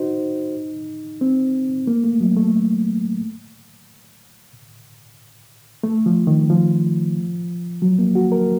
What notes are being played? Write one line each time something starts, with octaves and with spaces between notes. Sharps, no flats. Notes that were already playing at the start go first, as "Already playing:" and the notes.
Already playing: D#4 F#4 C5
C4
A#3
A3
F#3
A3
A3
F3
D#3
F3
F#3
A#3
F#4
A#4